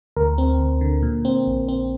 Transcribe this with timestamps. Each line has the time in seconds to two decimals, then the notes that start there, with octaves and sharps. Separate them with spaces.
0.17 D2 A#4
0.38 C4
0.59 D2
0.81 D3
1.02 A#2
1.25 C4
1.47 A#1
1.68 C4